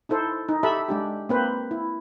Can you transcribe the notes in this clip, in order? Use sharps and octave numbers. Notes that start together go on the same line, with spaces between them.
D#4 E4 A4 C5
D#4
G4 A4 E5 A5 B5
G#3 D4 G4
A#3 C4 B4 C5
E4